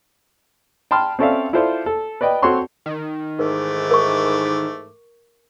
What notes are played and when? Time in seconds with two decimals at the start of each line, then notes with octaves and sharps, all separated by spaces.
0.91 G5 A5 B5 C6 F6
1.19 C4 C#4 A4 D5 E5 F5
1.53 E4 F4 A4 C5 D5
1.86 A4
2.21 B4 D5 D#5 G5
2.42 C4 F#4 A4 C#5 C6 C#6
2.86 D#3
3.39 G#2 E3 A3 A#4 D6
3.91 A#4 C#6